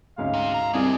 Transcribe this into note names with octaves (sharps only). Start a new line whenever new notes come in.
D2 G#2 C#4 F5
C3
F#2 A#5
C2 G2 G#4 D5